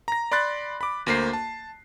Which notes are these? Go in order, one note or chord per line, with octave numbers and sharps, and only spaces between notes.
A#5 A#6
D5 B5 C6 F#6 A6
B5 D6
D2 A#3 C5 C7
A5